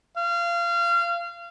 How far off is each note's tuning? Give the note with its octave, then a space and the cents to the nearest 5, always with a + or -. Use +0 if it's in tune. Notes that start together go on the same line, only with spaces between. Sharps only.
F5 -25